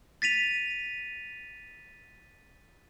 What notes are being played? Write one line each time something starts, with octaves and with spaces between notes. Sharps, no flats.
A6 B6 D#7 F7